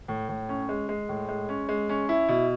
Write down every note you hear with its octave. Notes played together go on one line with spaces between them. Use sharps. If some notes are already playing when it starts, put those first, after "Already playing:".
A2
A2
C#4
G#3
G#3
A2
G#3
C#4
G#3
C#4
E4
B2